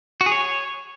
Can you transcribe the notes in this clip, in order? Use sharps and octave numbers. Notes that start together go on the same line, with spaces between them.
F#4
G#4
C#5